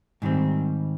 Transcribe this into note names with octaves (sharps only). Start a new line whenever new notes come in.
G#2 D#3 G3 C4